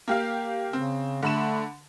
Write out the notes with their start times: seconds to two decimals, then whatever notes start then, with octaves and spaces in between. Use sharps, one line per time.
0.08 A#3 G4 F5
0.73 C#3 C4
1.22 D3 A3 B5 E7